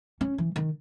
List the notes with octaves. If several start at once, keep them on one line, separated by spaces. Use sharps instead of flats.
C#4
E3
D#3